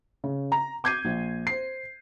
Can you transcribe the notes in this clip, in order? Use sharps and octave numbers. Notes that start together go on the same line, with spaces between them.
C#3
A#5
D6 G6 G#6 C7 D#7
A#1
C5 C7